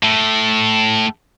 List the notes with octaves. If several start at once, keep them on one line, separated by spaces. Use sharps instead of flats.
A2